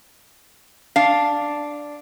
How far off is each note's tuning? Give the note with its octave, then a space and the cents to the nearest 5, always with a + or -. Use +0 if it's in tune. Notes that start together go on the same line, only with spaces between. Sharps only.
D4 +0 F5 +0